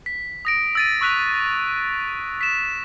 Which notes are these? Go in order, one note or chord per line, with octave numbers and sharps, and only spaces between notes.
B6
D#6 A#6 D7
E6 A6 D#7
C#6 E6 F#6 B6 F7
B6 E7